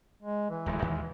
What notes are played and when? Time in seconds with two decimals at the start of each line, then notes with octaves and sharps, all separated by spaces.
0.22 G#3
0.50 E3
0.66 D1 E2 G#3
0.82 D#2 D#3 G#3